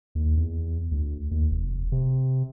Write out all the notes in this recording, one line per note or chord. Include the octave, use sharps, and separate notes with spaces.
D#2
E2
D2
D#2
F1
C3